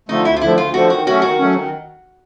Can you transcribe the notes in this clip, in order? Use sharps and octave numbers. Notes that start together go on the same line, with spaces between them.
D3 F3 A3 D#4
D2 E4
F4
D3 F3 A3 E4
D2 F4
D3 F3 A3 F#4
D#3 F#4
F#3 A3 C#4 F#4
D#3 F#4
F#3 A3 C#4
D#3